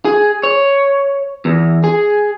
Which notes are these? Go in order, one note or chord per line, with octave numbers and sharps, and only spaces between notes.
G#4
C#5
E2
G#4